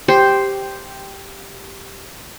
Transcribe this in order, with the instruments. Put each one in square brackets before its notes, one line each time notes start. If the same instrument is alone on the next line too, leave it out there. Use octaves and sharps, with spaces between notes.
[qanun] G4 C5